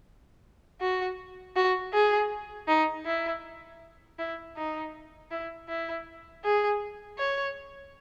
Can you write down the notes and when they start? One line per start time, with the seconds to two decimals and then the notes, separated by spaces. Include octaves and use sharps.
0.81 F#4
1.56 F#4
1.93 G#4
2.68 D#4
3.05 E4
4.18 E4
4.57 D#4
5.31 E4
5.69 E4
6.44 G#4
7.18 C#5